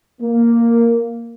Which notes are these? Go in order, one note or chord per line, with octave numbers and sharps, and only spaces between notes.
A#3